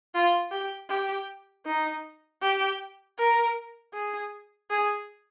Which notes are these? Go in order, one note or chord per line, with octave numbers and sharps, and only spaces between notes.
F4
G4
G4
D#4
G4
A#4
G#4
G#4